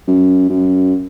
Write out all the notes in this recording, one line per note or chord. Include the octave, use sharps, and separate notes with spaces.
F#2
F#2